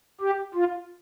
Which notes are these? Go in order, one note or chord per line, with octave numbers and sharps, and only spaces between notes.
G4
F4